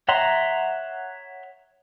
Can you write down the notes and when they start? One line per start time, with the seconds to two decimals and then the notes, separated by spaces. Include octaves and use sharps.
0.08 C#5 E5 F#5 A#5 C6